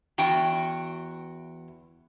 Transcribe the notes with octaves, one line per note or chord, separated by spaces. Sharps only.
E2 F#4 G5